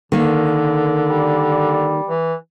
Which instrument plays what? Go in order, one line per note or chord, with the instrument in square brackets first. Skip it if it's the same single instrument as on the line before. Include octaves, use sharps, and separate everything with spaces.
[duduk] D3 [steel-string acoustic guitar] D#3 A#3
[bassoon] G3
[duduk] E3